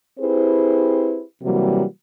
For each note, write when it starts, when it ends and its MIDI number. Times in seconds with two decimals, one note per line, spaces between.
0.19 1.21 60
0.19 1.21 64
0.19 1.21 67
0.19 1.21 68
0.19 1.21 71
0.19 1.21 72
1.42 1.83 48
1.42 1.83 52
1.42 1.83 54
1.42 1.83 55
1.42 1.83 58
1.42 1.83 66